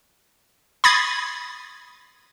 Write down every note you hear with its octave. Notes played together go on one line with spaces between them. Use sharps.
B5 D#6 G#6 A6 C7